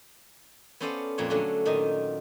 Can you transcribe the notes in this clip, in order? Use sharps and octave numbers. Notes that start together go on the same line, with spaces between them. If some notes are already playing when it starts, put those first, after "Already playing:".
B3 C#4 A4 C5 D5 F5
F2 A#2 A#3 C#5
D3 F#3 A3 C#4
A#2 D#3 D#4 D#5